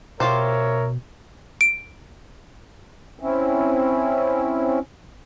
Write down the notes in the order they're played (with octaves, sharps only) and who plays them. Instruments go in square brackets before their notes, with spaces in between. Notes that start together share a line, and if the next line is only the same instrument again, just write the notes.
[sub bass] B2 [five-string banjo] F4 G4 C5 [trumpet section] A#4 C#5 E5
[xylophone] D7
[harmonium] C4 C#4 E4